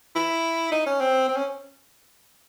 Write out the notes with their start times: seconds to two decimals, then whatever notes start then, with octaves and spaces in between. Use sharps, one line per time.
0.16 E4
0.72 D#4
0.86 C#4
1.01 C4
1.29 C4
1.37 C#4